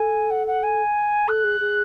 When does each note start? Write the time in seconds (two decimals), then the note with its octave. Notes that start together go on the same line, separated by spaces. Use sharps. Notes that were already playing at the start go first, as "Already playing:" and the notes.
Already playing: A4 G#5
0.30 F#5
0.47 F#5
0.63 G#5
1.28 A4 F#6
1.44 G#4
1.60 G#4